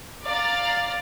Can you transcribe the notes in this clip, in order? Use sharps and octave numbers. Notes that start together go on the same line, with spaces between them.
D5 F5 A#5 A6